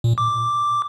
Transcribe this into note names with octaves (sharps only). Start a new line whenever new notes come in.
A#2
D6